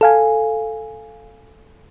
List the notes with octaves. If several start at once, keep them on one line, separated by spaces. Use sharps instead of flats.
A4 F5 G#5